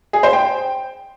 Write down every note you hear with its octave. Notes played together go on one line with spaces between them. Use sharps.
G#4
C5
G5